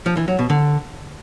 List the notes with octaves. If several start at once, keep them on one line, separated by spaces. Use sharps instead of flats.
F3
E3
F#3
B2
D3